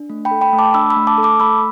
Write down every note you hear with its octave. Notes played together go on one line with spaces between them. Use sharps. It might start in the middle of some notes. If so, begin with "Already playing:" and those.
Already playing: D4
A3
G5 B5
A4
G5 B5
A3
A5 D6
D4 B5 E6
B5 E6
A3
A5 D6
A4
A5 D6
A3 B5 E6